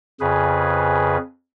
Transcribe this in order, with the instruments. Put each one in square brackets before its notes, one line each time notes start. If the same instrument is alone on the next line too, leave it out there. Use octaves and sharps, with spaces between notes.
[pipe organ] F2 C#3 G#4 B4